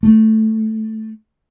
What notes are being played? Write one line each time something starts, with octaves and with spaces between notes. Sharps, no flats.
A3